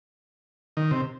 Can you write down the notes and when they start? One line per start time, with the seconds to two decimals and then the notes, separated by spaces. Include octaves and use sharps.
0.77 D#3
0.91 C3